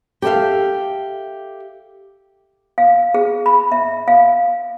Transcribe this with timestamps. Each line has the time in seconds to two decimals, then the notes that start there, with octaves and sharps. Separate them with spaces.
0.22 G4 A4 B4 E5 F5
2.78 F5
3.14 G#4
3.46 B5
3.72 E5
4.08 F5